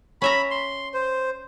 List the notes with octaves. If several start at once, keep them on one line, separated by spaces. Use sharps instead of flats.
C#4 E5 A#5 B5
C6
C5